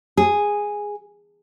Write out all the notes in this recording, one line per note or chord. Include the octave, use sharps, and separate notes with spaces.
G#4